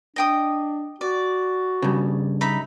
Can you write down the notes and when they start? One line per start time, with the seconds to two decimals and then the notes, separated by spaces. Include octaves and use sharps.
0.16 D4 D#5 G5 D#6
1.01 F#4 D5
1.82 G2 C#3
2.41 D#4 E5 B5